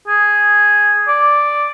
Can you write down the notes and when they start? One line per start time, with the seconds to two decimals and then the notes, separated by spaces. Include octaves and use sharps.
0.08 G#4
1.08 D5